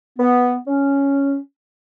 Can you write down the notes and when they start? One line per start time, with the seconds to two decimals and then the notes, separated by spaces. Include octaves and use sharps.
0.19 B3
0.68 C#4